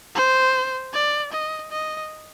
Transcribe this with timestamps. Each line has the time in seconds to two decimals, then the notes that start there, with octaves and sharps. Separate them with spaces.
0.15 C5
0.93 D5
1.33 D#5
1.72 D#5